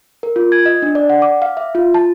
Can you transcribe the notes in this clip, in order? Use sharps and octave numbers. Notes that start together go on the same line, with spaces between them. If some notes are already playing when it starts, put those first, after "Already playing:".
A#4
F4
G#6
D#5
D4
D5
F#5
D6
F5
E5
F4
A5